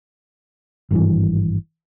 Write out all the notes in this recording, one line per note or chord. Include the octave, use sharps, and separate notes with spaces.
G#1 G2 E3